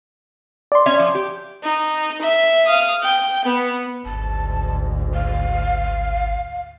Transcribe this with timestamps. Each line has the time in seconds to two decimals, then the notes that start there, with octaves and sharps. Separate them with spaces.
0.72 D5 C6
0.86 C#4 C#5 E5
0.99 F3
1.15 G4
1.63 D#4
2.21 E5
2.66 F5 D#6
3.03 G5
3.44 B3
4.06 G#1 D2 G#2 A5
5.14 F5